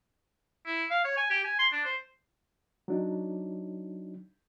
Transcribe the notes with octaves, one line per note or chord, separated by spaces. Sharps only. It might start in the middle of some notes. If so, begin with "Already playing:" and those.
E4
F5
C#5
G#5
G4
G#5
C6
D4
C5
F#3 D4 D#4